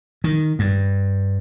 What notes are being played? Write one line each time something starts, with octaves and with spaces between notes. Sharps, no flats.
D#3
G2